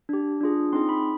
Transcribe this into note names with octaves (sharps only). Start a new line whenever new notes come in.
D4 G4
D4 F4 G#4
C4 D#4 G#4 C6
B5